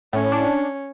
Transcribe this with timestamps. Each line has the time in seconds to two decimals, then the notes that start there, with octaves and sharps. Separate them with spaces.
0.13 A2 C#4
0.32 D4